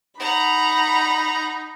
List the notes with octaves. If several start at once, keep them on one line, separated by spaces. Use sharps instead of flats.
D#4 F#5 A#5 B5